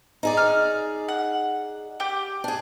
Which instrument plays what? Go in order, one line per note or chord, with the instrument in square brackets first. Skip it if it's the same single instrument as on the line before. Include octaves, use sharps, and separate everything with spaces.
[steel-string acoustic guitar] D#4 G#4 D5
[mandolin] F6
F#5
G4 G5
[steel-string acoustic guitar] D4 G#4